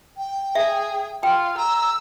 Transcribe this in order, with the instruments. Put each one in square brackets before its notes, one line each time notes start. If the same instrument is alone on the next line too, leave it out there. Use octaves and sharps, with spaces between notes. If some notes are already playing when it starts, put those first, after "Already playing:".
[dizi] G5
[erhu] G#4 [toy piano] E5
[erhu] F4 [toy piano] G5
[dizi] A#5 [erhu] E6